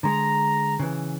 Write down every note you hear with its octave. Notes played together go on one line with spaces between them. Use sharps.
D3 G#3 A#5
C#3 E3